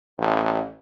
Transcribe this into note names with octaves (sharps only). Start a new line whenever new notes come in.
A1